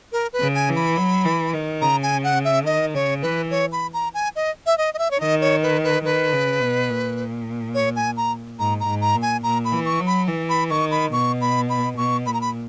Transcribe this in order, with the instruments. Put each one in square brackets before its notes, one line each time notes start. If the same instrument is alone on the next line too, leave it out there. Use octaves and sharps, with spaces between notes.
[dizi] A#4
B4
[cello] C#3
[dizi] G#5
[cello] E3
[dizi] B5
[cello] F#3
E3
D#3
[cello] C#3 [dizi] A#5
[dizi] G#5
F#5
E5
[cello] D#3 [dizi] D#5
[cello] C#3 [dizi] C#5
[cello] E3 [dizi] B4
[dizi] C#5
B5
A#5
G#5
D#5
E5
D#5
D#5
E5
C#5
[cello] D#3 [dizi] D#5
[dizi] C#5
B4
B4
[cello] D#3 [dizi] B4
[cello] C#3
B2
A#2
[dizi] C#5
G#5
A#5
[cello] G#2 [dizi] A#5
[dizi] A#5
[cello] G#2
[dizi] A#5
[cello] A#2
[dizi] G#5
[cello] A#2 [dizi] A#5
[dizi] B5
[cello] E3
[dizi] C#6
[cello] F#3
[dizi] B5
[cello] E3
[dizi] B5
[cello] D#3 [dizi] C#6
[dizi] B5
[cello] B2 [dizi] C#6
[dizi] B5
B5
[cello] B2 [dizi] C#6
[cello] A#2 [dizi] B5
[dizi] A#5
B5